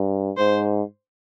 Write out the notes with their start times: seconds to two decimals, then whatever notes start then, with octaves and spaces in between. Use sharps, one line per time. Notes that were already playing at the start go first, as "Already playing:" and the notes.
Already playing: G2
0.37 G#2 C5